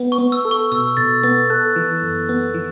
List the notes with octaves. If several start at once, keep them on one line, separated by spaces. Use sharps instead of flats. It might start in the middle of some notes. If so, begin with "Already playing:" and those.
Already playing: B3
C#6
B3
E6
A4
C#6
B2 E6
B2 A6
B3 A6
A4 F#6
E3
F#2
B3
E3